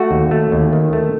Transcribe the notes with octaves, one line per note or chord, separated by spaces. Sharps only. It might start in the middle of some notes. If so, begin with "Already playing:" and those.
Already playing: A3 F#4
D#2
A3
D#2
D#3
A3